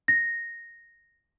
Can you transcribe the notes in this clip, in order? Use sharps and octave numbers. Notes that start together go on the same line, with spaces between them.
A#6